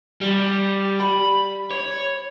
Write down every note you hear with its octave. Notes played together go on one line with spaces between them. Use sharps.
G3
B5
C#5